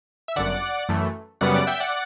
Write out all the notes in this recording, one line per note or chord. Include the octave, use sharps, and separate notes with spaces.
E5
G1 F#2 D3 D5 F#5
F#2 E3 A3
F#2 C#3 G3 B3 D5 F#5
D5 F#5
E5 G5
D5 F#5